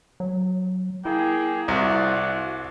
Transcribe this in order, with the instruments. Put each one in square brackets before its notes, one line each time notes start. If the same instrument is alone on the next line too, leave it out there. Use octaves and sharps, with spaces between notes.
[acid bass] F#3
[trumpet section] A#3 G#4 G5 [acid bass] E4
[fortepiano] C2 [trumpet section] F4 F#4 D5